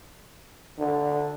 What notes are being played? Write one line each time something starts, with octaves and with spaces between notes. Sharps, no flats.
D3